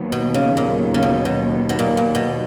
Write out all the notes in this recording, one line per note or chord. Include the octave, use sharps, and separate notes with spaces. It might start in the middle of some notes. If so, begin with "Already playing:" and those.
Already playing: D#2 D#3 F#3 B3
B2
C#3
A#2
C#3
B2
B2
B2
A#2
A#2
B2